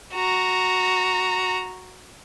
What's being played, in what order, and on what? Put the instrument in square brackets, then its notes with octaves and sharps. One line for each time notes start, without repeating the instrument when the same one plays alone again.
[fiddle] F#4 A#5